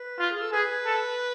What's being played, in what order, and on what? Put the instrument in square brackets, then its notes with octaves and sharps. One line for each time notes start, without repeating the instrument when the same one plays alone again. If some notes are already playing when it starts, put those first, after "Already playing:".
Already playing: [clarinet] B4
[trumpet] F4
[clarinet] G#4
A4
[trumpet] G#4 [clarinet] B4
[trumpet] A4